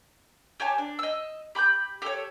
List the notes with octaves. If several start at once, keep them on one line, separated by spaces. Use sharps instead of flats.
G4 C#5 G#5 A5
D4
D#5 E6
G4 B5 D6 G6
G4 A4 C5 C#5